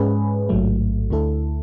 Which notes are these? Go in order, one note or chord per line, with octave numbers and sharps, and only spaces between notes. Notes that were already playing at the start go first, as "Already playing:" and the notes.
Already playing: G#2 G#3 C#4 G#4 B4
A1 G#2 F#3 A3
D2 D3 A3 E4 A4